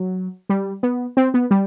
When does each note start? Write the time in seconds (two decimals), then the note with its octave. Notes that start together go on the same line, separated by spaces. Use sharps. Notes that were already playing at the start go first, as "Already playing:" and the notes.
Already playing: F#3
0.50 G3
0.83 B3
1.17 C4
1.34 B3
1.51 G3